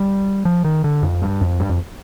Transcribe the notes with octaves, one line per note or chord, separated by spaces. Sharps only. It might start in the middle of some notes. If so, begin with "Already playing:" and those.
Already playing: G3
F3
D#3
D3
F2
G2
F2
G2
F2